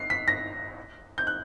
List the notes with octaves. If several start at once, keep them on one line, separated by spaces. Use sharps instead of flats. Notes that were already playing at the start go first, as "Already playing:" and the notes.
Already playing: C7
B6
A#6
G6
F#6